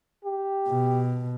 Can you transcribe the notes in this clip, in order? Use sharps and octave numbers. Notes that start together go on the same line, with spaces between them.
G4
B2